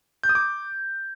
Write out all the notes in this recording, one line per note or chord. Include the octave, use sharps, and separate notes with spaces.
G6
D#6
D6